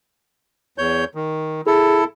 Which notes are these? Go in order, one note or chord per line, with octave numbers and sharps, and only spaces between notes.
E2 C#5 G6
D#3
E4 G#4 A4